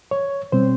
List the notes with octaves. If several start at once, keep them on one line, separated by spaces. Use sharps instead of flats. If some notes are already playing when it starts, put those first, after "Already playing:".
C#5
B2 G3 C4 C5